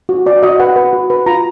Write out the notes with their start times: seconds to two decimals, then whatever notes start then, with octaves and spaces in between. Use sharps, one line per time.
0.09 F#4
0.26 F#4 D5
0.43 F#4 D#5
0.60 B4 F#5
0.76 B4
0.93 F#4
1.10 B4
1.26 F4 A#5